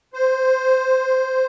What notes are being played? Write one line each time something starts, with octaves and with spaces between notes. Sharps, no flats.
C5